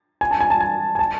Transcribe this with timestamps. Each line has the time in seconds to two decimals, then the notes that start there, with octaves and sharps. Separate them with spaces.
0.21 G#5
0.31 A5
0.41 G#5
0.50 A5
0.60 G#5
0.95 G#5
0.99 A5